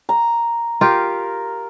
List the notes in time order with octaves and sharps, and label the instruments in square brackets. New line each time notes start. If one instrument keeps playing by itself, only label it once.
[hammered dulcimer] A#5
[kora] F4 G4 [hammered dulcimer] A#4